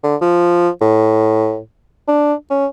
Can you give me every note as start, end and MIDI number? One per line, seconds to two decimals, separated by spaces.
0.04 0.16 50
0.21 0.69 53
0.81 1.59 45
2.08 2.34 62
2.50 2.66 61